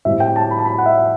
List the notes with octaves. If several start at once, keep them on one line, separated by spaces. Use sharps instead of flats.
A2 G3 C4 E5
G5
A5
B5
A5
B5
F#5
E5